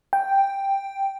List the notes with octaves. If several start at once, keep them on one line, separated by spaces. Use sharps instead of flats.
G5